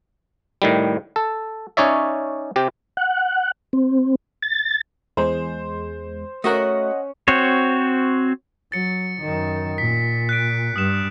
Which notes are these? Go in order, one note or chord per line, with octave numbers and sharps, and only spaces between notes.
A2 D#3 G3
A4
C#4 D#4 C#5 D5 E5
C3 G4
F#5
C4
A6
E2 G#3 C5
A3 C#4 F#4 A#4 C#5 D#5 F#5
C4 F#4 C5 C#5
F#3 A6 C#7
F#2 D#3
A#2 B6
F#6 B6 D7
G2 D#6 F6 E7